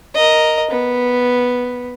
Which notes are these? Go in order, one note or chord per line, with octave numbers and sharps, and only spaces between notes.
A#4 D#5
B3